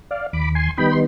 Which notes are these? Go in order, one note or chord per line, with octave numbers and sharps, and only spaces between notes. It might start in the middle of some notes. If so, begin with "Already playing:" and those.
D5 F5
D#2 B5 D6
G#5 C6
D#3 G3 B3 D#4 G5 B5
C6